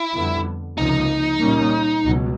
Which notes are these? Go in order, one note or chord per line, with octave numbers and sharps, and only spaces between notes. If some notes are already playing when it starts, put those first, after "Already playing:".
Already playing: E4
F2 D3 G3 B3
C#2 C3 F3 A#3 D#4
A#2 G3 A#3 C#4
C#2 B2 F#3